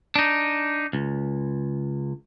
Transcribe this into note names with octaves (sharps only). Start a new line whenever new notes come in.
D4 D#4
C#2